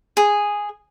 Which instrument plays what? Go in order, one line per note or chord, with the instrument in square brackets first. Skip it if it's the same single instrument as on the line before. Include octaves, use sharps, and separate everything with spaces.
[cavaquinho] G#4